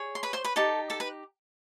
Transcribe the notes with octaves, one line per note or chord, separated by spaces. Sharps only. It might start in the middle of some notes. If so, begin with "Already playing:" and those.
Already playing: G#4 C#5
C6
B4 B5
C5 C6
B4 B5
D#4 G4 A4 A5
A4 A5
B4 B5